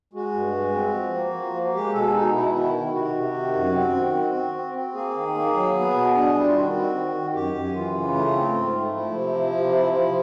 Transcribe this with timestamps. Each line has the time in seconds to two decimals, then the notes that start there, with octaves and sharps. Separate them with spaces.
0.13 G#3 F#4
0.34 G2
0.54 G#3
0.74 C4
0.93 F3
1.14 A#3
1.34 F3
1.54 A#3
1.74 G#3 G4
1.93 B2 A4
2.14 B2 D#4
2.34 B2 E4
2.54 D#3 E4
2.74 D#3
2.94 C3 F#4
3.13 C3
3.34 D#3
3.54 F#2
3.74 C4
3.94 D#3
4.15 C4
4.34 C4
4.54 C4
4.74 C4
4.94 A#3 G#4
5.15 D#3
5.35 A#3
5.54 F#3
5.75 B3
5.94 B2
6.15 D4
6.34 G3 E4
6.46 F4
6.54 D#3 F#4
6.74 C4
6.95 D#3
7.15 D#3
7.34 F#2 G4
7.54 F#2
7.74 E3 F4
7.95 C#3
8.15 A3
8.34 C4
8.55 G#2
8.74 A3
8.95 F3 E4
9.15 C3
9.35 F3
9.55 C3
9.75 F3
9.95 F3